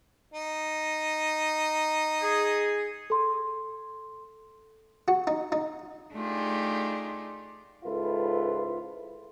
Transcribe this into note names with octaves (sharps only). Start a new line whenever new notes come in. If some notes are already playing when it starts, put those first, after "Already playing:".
D#4
G#4
A4 C6
F#4
D#4
D#4
A3 D4 D#4 F4 G4 G#4
C#2 G#2 E4 F4 A4 B4